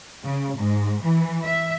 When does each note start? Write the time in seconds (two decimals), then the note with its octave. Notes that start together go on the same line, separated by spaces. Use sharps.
0.24 C#3
0.58 G#2
1.04 E3
1.44 E5